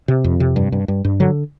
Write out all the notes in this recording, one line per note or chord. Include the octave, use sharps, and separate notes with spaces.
C3
F2
C3
G2
G2
G2
G2
D3 F#3